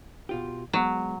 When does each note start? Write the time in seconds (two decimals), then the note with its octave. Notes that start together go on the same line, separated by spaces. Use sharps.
0.29 B2 F4 G4
0.73 F#3 G#3 B3